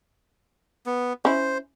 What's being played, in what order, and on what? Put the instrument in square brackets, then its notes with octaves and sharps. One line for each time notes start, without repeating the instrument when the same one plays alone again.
[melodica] B3
[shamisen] C#4 E4 [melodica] C5